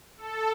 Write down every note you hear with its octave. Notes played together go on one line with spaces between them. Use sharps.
A4